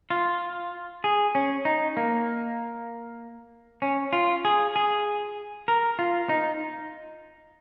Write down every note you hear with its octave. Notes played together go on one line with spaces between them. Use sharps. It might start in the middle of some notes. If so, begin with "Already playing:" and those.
F4
G#4
C#4
D#4
A#3
C#4
F4
G#4
G#4
A#4
F4
D#4